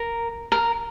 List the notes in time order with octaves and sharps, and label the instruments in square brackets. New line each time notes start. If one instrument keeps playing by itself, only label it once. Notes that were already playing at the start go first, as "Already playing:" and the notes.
Already playing: [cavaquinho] A#4
A#4